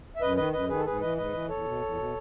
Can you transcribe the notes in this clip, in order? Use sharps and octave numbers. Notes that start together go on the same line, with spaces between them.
E5
F#2 B4 D#5
D#3 B4 D#5
F#2 B4 D#5
D#3 G#4 B4
A4
G#2 G#4 B4
E3 B4 D#5
G#2 B4 D#5
E3
E2 A4 C#5
B2
E2
B2